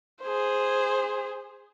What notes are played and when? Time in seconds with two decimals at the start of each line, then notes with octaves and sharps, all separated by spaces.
0.22 G#4 C5